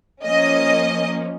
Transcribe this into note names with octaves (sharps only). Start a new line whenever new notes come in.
F3 A#3 C#4 D#5